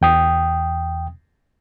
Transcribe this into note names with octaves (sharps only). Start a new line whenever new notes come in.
E2 G5 D#6